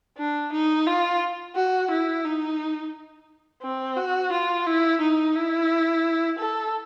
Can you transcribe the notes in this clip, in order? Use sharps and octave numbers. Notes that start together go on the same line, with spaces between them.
D4
D#4
F4
F#4
E4
D#4
C4
F#4
F4
E4
D#4
E4
A4